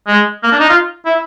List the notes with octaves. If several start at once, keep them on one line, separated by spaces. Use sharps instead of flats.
G#3
A#3
D4
D#4
F4
E4